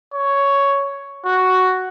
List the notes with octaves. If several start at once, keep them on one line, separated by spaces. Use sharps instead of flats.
C#5
F#4